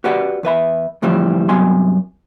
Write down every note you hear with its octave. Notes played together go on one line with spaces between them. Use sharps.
F#4 G4 B4 D5 F#5
E2 B4 E5 B5
D2 A2 E3 F3 G3 C4
G2 C3 F#3 B3 G#5 C6